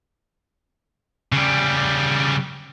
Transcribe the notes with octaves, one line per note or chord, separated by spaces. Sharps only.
C#3 G3